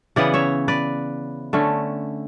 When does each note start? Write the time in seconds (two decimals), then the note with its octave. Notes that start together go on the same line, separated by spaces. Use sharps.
0.16 C#3 E3 B3 D5 F#5
0.34 C#5 E5
0.68 B4 D5
1.53 D3 A3 C#4